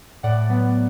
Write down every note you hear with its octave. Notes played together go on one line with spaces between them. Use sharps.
A2 D5 F#5
F#3 B3